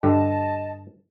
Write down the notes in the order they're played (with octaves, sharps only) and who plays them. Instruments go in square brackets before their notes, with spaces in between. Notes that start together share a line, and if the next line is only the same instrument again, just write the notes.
[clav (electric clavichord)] G2 D3 G4 [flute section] D#5 A5